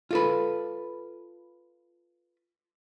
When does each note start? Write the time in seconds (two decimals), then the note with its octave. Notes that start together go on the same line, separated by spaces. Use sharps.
0.11 F4 A4 B4